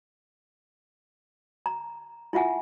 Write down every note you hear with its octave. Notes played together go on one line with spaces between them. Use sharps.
A#5
E4 F4 E5 F#5 G#5